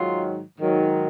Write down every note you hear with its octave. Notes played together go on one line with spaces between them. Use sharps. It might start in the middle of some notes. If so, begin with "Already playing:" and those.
Already playing: G#2 D#3 F#3 F4
G#2 D#3 F#3